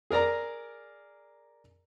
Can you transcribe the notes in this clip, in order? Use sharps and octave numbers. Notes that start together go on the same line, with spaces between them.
G#4 A#4 D5 A#5